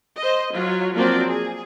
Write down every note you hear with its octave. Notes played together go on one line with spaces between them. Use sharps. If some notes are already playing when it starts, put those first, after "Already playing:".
C5 D#5
F#3 F4 C#5
F3 F#3 A#3 C4 F4 D5
G#4